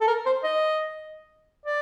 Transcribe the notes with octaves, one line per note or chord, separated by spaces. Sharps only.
A4
A#4
C5
D#5
D5